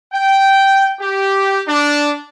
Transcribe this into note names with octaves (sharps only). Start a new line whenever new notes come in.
G5
G4
D4